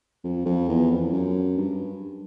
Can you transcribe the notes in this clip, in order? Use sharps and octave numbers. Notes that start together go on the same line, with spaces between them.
F2
F2
E2
F2
F#2
G2